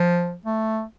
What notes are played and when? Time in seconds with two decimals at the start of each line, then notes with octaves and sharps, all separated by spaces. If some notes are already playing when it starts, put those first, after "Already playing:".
Already playing: F3
0.45 A3